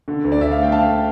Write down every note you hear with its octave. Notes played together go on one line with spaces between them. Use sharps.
D3
D2
D5
D2 E5
A3 F5
G5
D3 F5 A5